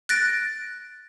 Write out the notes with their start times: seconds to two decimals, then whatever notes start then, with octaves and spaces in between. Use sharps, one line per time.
0.09 F#6 A6 A#6 D7